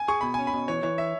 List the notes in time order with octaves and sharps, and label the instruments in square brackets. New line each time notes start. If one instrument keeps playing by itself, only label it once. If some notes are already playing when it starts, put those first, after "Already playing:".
Already playing: [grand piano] G#5
[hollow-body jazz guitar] G#4 [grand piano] C#6
[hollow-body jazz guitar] B2 [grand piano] B5
[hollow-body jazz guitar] C#4 [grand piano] G#5
[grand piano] B5
[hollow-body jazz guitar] B2
[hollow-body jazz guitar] E3 [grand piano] C#5
[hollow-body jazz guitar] E3 [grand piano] C#5
[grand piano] E5